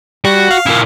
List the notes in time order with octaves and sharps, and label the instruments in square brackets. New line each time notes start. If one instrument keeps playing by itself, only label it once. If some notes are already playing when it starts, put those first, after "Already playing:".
[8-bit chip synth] G3 [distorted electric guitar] F#4
[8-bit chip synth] F5
[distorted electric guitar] A#2 E4